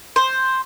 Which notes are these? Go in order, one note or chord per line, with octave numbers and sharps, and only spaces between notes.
C5